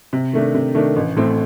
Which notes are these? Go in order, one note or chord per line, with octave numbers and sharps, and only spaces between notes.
C3
D#3 A3 D4
C3
D#3 A3 D4
A1
A2 A3 C4